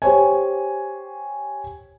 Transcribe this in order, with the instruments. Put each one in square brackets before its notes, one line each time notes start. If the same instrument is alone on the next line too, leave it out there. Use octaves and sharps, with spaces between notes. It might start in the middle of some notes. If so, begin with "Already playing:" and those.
[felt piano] G4 C5 C#5 G#5